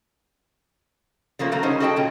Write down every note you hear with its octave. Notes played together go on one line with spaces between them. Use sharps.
C#3 F3 A3 A#3
D3 F#3 A3 A#3 F#4 A#5
G3 C#4 D#4 G#4 C5
F#4 G#4 A4 D#5 G5 A5
A#2 C#3 F3 A#3